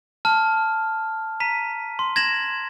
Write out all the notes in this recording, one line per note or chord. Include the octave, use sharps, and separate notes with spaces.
A5 F6
A#5 B6 D#7
C6
G#6 A#6 E7 F#7